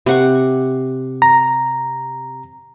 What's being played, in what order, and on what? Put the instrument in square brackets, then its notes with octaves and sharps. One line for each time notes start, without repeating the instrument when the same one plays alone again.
[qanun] C3 F#5 C#6
[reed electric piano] A#5